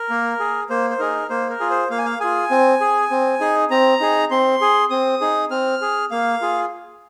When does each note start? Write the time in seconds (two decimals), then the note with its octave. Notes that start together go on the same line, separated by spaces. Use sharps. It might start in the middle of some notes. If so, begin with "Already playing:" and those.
Already playing: A#4
0.10 A#3
0.40 G#4
0.70 A#3 C5
0.90 C5
0.99 D#4 G#4 A#4
1.30 A#3 C5
1.50 A#4
1.60 F4 G#4
1.70 C5
1.90 A#3 F5
1.98 G#5
2.06 F5
2.20 F4 G#4 G#5
2.51 C4
2.81 G#4
3.11 C4
3.41 D#4 G#4
3.70 C4 A#5
4.00 D#4 G#4
4.31 C4 C6
4.61 G#4
4.90 C4 D#6
5.21 D#4 G#4
5.51 C4 F6
5.81 G#4
6.11 A#3 F5
6.41 F4 G#4